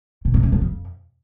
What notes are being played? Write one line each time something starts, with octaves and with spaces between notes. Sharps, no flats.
B2
F#2
C3
F3
F2